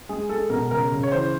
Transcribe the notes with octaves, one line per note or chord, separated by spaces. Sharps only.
G#3 G#4
G#3 A4
B2 A#4
C#3 A#4
C#3
C#5
E3 C5